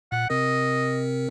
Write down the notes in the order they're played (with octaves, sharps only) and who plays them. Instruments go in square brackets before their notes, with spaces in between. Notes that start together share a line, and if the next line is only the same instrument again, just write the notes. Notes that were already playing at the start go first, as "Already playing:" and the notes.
[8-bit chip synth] A#2 [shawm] F#5
[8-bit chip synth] C3 C4 A#4 [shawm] D#5